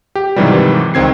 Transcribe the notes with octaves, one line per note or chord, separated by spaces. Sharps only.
G4
G#2 C3 D#3 E3 F#3 G3
C#2 D#3 C4 G#6 C7